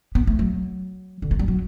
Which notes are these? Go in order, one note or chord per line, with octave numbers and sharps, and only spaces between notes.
B3
A3
F#3
D3
A3
G3
F#3